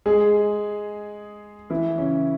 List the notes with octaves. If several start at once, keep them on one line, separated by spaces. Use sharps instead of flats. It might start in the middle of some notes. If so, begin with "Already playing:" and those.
G#3 G#4
E3 E4
C#3 C#4